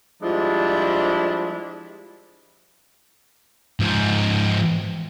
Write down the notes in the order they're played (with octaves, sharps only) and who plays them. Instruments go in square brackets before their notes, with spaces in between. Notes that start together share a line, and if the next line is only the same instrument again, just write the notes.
[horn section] F3 G3 G#3 D4 E4
[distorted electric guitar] G#2 F3